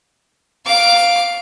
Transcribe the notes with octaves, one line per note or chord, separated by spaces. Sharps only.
F5 D6